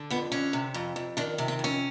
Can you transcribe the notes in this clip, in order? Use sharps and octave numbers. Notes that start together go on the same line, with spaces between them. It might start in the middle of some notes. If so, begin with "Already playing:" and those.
Already playing: D3
F2 B3
D3 C#4
C3
F2
F2
D#3 D4
C3
C4
F2
C#4